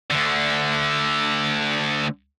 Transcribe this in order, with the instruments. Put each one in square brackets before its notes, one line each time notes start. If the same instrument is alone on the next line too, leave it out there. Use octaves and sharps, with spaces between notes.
[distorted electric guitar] D2 D3